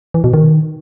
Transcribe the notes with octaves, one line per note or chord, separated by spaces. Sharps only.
E3
B2
D#3